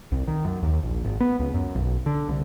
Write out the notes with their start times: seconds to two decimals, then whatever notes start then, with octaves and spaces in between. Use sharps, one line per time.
0.12 C2
0.27 D#3
0.45 F#2
0.63 D#2
0.83 A#1
1.05 G#1
1.20 B3
1.40 C#2
1.54 F#2
1.75 B1
2.06 D3
2.28 C2